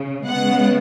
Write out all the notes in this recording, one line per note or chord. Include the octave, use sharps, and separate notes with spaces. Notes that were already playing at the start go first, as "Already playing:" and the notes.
Already playing: C#3
C#3 G#3 B3 F#5